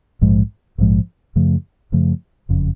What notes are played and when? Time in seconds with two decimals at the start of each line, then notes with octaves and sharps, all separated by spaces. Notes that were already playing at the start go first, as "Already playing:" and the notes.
0.21 A#1 G#2 F3 G#3
0.78 A#1 G#2 F3 G#3
1.36 F#2 C#3 F3 A3
1.92 F#2 C#3 F3 A3
2.49 F#1 F2 C#3